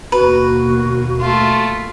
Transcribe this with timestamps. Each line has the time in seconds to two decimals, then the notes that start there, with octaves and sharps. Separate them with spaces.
0.12 D#2 B2 A#3 F#4 B4
1.20 A3 F4